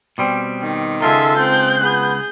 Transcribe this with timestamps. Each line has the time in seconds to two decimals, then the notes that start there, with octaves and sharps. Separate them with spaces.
0.18 B2 G3 C4
0.62 D#3
1.02 C#2 G#3 F4 A4 E5
1.37 C4 G6
1.83 B3 G#4